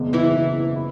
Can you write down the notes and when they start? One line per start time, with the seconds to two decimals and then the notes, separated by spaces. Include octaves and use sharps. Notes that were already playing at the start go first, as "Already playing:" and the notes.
Already playing: F#1 E2 B2 G#3
0.13 E3 E4
0.76 E4